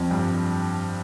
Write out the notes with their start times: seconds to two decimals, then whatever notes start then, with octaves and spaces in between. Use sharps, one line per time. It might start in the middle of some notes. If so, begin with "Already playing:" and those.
Already playing: F2
0.11 G2